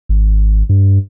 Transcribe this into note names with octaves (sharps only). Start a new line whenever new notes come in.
G#1
G2